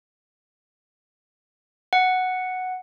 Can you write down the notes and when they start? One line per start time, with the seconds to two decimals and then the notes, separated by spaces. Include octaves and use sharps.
1.93 F#5